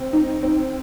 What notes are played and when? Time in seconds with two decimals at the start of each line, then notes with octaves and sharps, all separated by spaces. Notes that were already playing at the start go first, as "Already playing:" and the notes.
Already playing: C4
0.13 D#4
0.43 C4